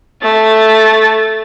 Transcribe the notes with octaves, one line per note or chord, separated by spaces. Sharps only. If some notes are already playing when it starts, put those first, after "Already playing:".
A3 A6